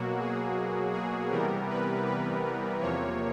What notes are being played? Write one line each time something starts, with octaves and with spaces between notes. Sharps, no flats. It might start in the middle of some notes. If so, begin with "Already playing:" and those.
Already playing: B2 F#3 A#3 F#4
G#4
G#4
C3 E3 G3 B3 A#4
B4
B4
E2 C3 F3 A#3 C#5